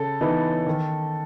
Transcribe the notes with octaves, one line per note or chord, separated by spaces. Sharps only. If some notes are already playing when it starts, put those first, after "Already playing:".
Already playing: C#3 A4
E3 B3 D#4
D#3